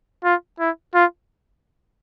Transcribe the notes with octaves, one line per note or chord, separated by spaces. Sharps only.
F4
E4
F4